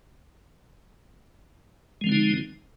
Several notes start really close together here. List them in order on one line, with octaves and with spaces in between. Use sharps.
G#3 F3 C4 D3 D#4